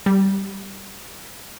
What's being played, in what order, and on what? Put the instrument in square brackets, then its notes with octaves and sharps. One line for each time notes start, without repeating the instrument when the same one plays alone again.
[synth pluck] G3